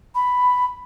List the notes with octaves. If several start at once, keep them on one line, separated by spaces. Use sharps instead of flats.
B5